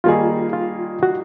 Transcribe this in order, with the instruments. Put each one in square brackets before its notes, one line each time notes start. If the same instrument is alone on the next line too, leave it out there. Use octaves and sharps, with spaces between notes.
[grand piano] D#3 G3 A#3 D#4 G#4 [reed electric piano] F4
[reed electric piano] F4
F#4